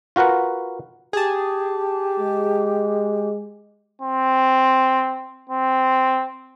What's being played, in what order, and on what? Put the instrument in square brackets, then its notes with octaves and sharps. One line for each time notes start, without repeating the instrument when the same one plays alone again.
[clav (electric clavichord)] F4 F#4 A#4 B4 F#5
[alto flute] G4 [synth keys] G#4 A5
[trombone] G#3
[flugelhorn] C4
C4